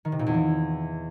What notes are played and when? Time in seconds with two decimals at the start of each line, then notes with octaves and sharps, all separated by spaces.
0.05 D#3
0.12 C3
0.19 A#2
0.27 E2
0.34 E3